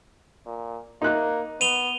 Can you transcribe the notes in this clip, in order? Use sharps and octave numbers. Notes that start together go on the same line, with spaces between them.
A#2
A#3 D#4 F#6
B3 D#7 F7 G7